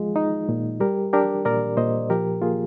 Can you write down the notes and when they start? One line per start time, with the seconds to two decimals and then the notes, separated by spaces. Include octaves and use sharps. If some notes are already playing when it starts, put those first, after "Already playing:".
Already playing: F3 G#3 F4 G#4
0.16 D#4
0.49 A#2
0.80 G3 G4 A#4
1.13 D4 G4 A#4
1.45 A#2 A#4 D5
1.77 A#2 C5 D#5
2.10 F3 G4 A#4
2.42 A#3 F4 G#4